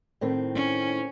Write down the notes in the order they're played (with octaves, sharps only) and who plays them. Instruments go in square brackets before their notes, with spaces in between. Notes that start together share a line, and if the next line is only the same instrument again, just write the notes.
[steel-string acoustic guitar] A2 D#3 C4
[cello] C#4